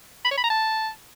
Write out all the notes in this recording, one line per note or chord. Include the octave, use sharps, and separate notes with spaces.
B5
C#5
B5
A#5
A5